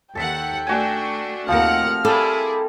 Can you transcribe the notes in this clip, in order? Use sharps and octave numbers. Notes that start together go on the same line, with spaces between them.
D#2 A4 E5 F#5 G5 A5
A3 D4 F#4 G#5
D#2 F3 A3 C4 A#4 F#5 F6
G3 E4 G#4 A4